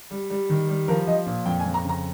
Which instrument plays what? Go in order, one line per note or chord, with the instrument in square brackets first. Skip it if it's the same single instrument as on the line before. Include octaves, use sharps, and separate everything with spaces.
[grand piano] G3
G3
D#3
G3
F3 A#4
F3 D#5
A#2
F2 G5
G#5
F2
A#5
C#3
A#5